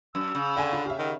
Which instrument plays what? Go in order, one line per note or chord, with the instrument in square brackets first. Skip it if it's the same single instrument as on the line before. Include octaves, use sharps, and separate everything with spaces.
[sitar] F#2 [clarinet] E6
[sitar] C#3
[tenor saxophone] D3 [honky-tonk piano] G5 G#5
[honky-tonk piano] D4
[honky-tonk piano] G4 E5 [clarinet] F5
[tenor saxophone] D#3 [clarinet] F#5